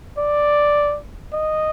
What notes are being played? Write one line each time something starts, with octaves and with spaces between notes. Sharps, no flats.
D5
D#5